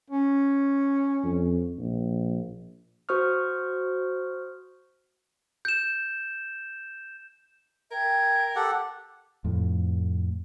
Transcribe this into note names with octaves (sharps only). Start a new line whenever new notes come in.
C#4
F2
A#1
F#4 C5 C#6 D#6 F6
G6 E7
A#4 E5 G5 G#6
G4 A4 F#5
F2 A2